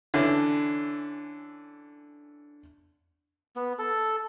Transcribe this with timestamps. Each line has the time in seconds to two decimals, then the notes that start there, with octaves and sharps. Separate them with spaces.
0.14 D3 E3 C#4
3.56 B3
3.79 A4